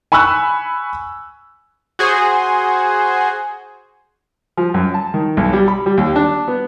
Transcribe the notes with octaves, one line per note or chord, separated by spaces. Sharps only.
G#5 B5 C#6 E6 F#6
F#4 G#4 C5
F3
F#2
A5
D#3
B1
G3
B5
G3
D#2
D4
B3